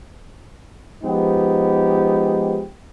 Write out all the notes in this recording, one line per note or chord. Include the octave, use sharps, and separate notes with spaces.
F3 G#3 B3 D#4 G4